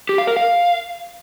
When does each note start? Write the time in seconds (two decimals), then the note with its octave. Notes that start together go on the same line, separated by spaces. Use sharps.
0.09 G4
0.18 F5
0.27 A#4
0.36 F5